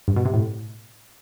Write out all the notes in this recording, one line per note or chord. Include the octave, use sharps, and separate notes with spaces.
G2
B2
C3
A2